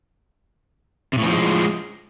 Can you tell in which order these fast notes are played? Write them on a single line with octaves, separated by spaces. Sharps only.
C3 A2 E3 F3 G#3